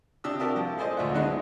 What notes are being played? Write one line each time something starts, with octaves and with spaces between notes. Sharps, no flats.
C3 D4 G4 D#6 E6
F#4 G4 A#4 E5 A5 D#6
F3
A3 G#4 C5 D5 D#5
G#1 D2 F4 E5 F#5
F#3 G#3 B3 D4 D#4